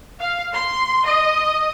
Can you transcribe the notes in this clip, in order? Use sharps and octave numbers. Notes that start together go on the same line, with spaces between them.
F5
C6
D#5